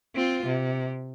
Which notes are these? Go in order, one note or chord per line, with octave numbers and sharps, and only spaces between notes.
C4 F4
C3